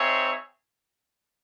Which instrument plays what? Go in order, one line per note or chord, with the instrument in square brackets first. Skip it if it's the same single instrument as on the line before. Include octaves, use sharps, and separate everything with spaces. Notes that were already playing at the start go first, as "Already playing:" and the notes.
Already playing: [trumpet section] C4 D#4 G#4 C#5 E5